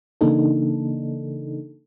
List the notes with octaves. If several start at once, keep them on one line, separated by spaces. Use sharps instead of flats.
C#3 E3 A#3 D4 D#4 A4